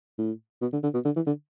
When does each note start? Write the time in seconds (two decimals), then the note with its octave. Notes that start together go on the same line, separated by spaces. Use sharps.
0.18 A2
0.62 B2
0.73 D3
0.83 D3
0.94 B2
1.05 D3
1.16 E3
1.27 D3